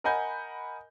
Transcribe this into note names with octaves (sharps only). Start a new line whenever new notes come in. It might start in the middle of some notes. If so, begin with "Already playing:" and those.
A#4 D#5 F#5 G#5 B5 G6